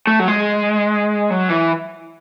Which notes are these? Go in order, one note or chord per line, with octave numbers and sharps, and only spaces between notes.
A3
F#3
G#3
F#3
E3